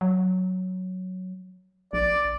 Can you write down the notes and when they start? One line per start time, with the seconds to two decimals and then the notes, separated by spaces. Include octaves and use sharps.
0.01 F#3
1.93 A#1 D5